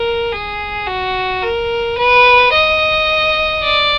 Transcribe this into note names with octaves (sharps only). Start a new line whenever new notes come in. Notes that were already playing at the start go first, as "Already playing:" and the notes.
Already playing: A#4
G#4
F#4
A#4
B4
D#5
D5